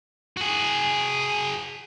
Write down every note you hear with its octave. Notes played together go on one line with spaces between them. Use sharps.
F#4 G#4